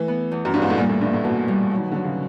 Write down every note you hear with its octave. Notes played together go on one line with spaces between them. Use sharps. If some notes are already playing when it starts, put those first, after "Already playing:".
Already playing: E3 A3 B4
B3
E2
F#2
G2 B3
G#2
A2
A#2 G3
A2
G2 E3
A2
B2 A#3
G3
F#3
D#3
D3 F#3
C#3